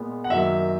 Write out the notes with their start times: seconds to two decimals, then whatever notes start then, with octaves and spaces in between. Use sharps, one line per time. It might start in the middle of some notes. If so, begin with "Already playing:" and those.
Already playing: A#2 G#3 B3
0.24 F#5
0.30 F#2 D#3 F#3 A#3 E5